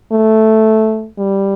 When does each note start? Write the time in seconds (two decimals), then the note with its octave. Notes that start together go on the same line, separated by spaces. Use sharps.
0.12 A3
1.19 G3